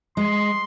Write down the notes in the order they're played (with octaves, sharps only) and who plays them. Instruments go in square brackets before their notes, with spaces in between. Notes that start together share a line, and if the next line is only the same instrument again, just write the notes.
[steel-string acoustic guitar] G#3 [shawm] C6